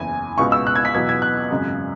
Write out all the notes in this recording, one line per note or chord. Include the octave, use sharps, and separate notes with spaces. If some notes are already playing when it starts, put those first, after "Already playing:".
Already playing: F#1 E2 E3 G#5
C#2 B2 G#3 B3 C#6
E6
F#6
G#6
B6
E2 B2 F#3 B3 G#6
G#6
F#6
G#1 F#2 C#3 G#3